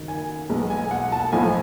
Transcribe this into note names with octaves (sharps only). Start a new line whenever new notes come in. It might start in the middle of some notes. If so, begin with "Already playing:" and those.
Already playing: F#1 D#3 F#3
G#5
B1 B2 G#3 B3
G#5
F#5
A5
B1 A2 F3 G#5